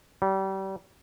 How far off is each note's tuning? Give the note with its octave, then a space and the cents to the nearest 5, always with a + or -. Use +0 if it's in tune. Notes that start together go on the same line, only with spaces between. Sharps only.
G3 -30